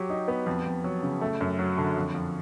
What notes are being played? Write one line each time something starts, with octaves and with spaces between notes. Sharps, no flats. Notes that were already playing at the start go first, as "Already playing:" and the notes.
Already playing: F#3 G4
D#4
B3
F2
F2
F#3
C#3
A3
F#2
F#3
D3
F2
F2